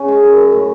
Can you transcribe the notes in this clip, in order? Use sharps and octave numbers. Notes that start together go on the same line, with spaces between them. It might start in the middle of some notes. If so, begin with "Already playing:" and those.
Already playing: C#3 C#4
G#3
F#2
F#2
A2